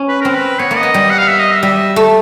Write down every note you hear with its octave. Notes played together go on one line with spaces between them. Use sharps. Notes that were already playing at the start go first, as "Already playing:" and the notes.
Already playing: C#4
B4
C4 A#4
B4
B3 C#5
A#3
D#5
B3
G3
F#5
F5
E5
D#5
E5
G3 E5
A3